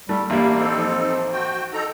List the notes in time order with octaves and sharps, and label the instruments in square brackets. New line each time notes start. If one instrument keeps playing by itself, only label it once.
[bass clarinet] G3 [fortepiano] A3
[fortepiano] A1 G3 [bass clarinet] A#3
[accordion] C4 D#4 A4
[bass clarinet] F3
[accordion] F#4 G5
D#4 A4 A#5